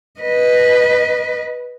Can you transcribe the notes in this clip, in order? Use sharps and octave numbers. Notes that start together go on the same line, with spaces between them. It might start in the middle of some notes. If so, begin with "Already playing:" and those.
B4 D#5